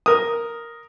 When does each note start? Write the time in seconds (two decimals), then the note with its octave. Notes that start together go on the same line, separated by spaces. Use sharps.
0.06 A#4 D#6